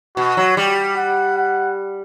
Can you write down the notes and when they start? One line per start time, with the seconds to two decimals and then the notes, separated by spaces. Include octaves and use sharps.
0.17 B2 F#4
0.37 F#3
0.57 G3 G4
0.96 F#5
1.37 F#5